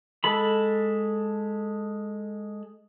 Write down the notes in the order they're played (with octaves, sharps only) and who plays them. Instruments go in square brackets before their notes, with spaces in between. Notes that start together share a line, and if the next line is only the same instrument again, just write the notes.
[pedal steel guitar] G#3 A4 B5